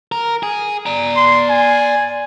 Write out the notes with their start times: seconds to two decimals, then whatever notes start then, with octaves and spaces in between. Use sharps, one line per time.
0.12 A#4
0.43 G#4
0.86 D5 A#5
1.16 C6
1.49 G#5